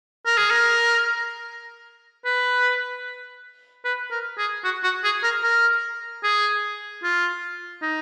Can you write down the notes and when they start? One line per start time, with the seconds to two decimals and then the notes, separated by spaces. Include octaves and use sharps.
0.26 A#4
0.38 G#4
0.51 A#4
2.25 B4
3.85 B4
4.11 A#4
4.38 G#4
4.64 F#4
4.83 F#4
5.04 G#4
5.23 A#4
5.43 A#4
6.23 G#4
7.03 F4
7.82 D#4